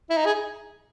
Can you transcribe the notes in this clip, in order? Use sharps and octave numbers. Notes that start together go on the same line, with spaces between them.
E4
D#4
G#4